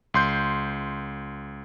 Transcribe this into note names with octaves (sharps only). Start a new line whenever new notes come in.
C#2 C6 G6